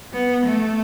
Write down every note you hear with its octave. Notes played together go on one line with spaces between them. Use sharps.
B3
A3